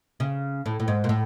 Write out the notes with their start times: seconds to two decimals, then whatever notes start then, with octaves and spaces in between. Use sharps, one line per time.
0.20 C#3
0.66 A2
0.80 A2
0.88 G#2
1.04 A#2
1.09 A2